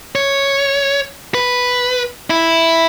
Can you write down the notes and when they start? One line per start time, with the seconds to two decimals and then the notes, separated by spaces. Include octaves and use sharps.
0.15 C#5
1.34 B4
2.30 E4